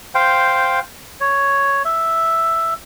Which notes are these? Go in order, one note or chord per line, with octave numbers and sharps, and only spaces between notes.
C5 F5 G5
C#5
E5